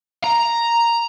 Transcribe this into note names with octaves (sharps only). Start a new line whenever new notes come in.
A#5